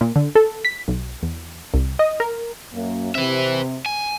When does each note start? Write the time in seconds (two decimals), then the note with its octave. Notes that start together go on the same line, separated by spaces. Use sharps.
0.01 A#2
0.16 D3
0.35 A4
0.65 B6
0.88 B1
1.23 E2
1.74 C2
1.99 D#5
2.20 A#4
2.74 F#2 A#3
3.15 C3 C4 B4 E5
3.86 G#5